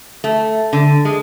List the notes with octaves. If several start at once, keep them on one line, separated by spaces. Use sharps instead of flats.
A3
D3
G#3